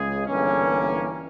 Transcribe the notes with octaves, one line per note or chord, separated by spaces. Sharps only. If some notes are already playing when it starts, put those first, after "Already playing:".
Already playing: C#2 C#3 G#3 G#4
G1 G2 E3 A#3 C#4